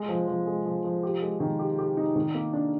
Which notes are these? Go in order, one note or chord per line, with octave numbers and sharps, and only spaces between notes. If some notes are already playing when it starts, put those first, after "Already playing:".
Already playing: G#3
F3
F3
G#3
F3
F3
G4
G#3
D#3
G4
G4
D#4
D#3
A#3
D4